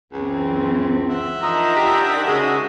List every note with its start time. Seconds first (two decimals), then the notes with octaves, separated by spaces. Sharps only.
0.13 C#2 F#2 E3 C4
1.10 C5 E5 F#5
1.42 F3 D4 D#4 A#4 D#5 A#5 E6
1.76 G4
2.27 C#3 G#3 F#4 D#6